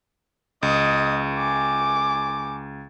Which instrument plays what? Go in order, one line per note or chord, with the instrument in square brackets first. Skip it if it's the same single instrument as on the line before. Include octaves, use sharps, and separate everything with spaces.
[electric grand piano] C#2 [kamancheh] D#5 D#6
[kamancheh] G#5 D6